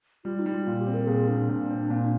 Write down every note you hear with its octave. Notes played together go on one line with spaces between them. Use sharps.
G3 F4
D#4
G3
F4
A#2 F4
G4
C4
A#4
A#2 G#4
A#2 D4
A#2
C4
A#2